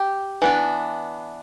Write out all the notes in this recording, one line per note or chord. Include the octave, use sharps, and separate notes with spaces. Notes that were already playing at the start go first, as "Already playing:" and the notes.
Already playing: G4
E3 B3 D4